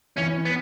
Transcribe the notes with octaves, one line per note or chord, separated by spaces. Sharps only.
E3 C#4
B3